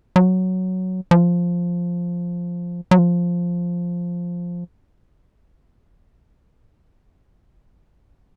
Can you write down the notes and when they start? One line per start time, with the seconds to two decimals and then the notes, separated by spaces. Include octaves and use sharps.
0.16 F#3
1.11 F3
2.91 F#3
2.99 F3